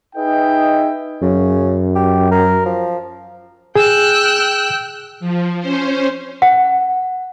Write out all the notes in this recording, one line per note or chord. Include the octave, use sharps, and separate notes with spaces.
D#4 G#4 B4 D#5 E5 G5
F#2 C#3
G4
A#4
F3
G#4 G5 E6 F#6
F3
C#4 C5
F#5